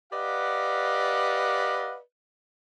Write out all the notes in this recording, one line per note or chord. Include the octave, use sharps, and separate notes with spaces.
G4 B4 D5 D#5 F5 F#5